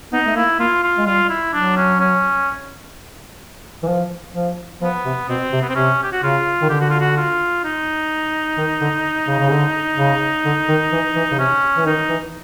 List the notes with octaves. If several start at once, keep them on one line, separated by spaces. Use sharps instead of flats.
B3 D#4
A3
A#3 E4
A#3 F4
F4
G#3
G3 F4
E4
F#3 D4
C#4
C#4
E3
F3
F3
F3 B3
C3
B2 C4
C3
B3
C4
C3 C#4
G4
F#4
C#3 F4
D#3
D3 G4
F#4
F4
F#4
F4
D#4
D#3
D3
C#3
C#3
D3
C#3
D3
D#3
E3
E3
C#3
C3 C#4
E3
D#3 D#4
E3